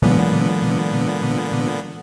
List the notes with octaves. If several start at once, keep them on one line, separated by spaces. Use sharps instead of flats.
A#2 D3 E3 F#3 G#3 B3